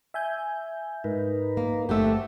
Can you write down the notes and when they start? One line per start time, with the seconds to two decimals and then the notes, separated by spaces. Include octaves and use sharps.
0.14 E5 G#5 G6
1.04 G#2 D#4 A#4 B4
1.57 A#3
1.89 G1 A3 C4 G4 F#5 E6